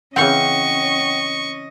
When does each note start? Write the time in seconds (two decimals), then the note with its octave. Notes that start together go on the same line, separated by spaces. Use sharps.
0.16 C#3 E3 C4 C#4 D#5 F#5 G5 C#6